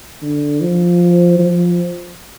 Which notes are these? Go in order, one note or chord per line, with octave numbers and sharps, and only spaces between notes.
D3
F3
F3